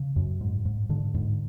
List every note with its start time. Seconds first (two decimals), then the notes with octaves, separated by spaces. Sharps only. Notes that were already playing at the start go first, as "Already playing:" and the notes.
Already playing: C#3
0.16 F#2
0.41 G#2
0.65 G#2
0.89 G#2 D3
1.14 G#2